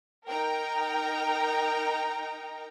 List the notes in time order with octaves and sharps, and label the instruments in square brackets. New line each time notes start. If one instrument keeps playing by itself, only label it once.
[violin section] D#4 A#4 G5 A#5